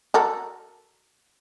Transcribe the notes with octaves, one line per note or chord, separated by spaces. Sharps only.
F#4 A4 A#4